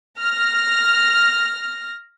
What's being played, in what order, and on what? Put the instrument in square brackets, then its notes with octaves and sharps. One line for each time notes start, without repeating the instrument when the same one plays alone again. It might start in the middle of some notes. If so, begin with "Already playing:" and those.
[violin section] F6 A#6